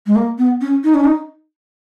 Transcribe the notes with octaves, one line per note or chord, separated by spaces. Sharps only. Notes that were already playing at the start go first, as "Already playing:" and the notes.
G#3
A#3
B3
C#4
D#4
C#4
D#4